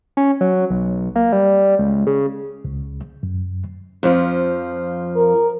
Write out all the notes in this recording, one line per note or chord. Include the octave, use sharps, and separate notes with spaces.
C#4
F#3
B1
A#3
G3
C#2
C#3
C#2
F#2
F2 F3
A#4